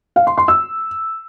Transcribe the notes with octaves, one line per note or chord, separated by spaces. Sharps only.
F5
C6
C6
E6